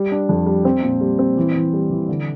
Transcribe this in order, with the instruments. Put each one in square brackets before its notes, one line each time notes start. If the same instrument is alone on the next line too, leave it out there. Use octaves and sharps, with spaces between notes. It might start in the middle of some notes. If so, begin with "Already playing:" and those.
Already playing: [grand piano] G3
D4
F2
G3
C4
A#2
G3
C4
E3
E3
G3
E3
D3